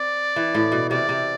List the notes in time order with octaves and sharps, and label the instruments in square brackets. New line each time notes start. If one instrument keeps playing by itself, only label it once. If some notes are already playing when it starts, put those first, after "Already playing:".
Already playing: [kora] C4 [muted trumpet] D5
[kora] E3
A2
B2
[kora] C3 [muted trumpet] D5
[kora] C3